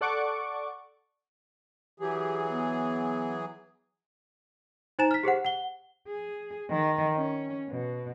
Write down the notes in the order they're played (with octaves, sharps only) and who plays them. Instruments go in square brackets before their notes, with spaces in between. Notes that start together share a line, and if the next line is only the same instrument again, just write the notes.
[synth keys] A4 D5 F#5 C#6 D6
[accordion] E3 F#3 G#4 [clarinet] G4
[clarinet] B3
[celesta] D#4 C5 G#5 A#5 A6 E7
F6 B6
G4 G#4 C5 F#5
F#5 G7
[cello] G#4
D#3
C#4
B2